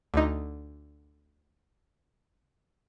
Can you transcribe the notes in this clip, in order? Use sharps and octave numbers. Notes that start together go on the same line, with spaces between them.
D2 D#4